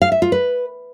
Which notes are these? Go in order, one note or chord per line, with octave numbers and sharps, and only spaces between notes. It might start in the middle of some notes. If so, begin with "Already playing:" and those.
F5
E5
F4
B4